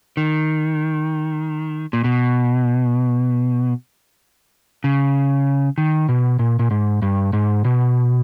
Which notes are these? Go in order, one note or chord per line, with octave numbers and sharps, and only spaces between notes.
D#3
A#2
B2
C#3
D#3
B2
A#2
A#2
G#2
G2
G#2
B2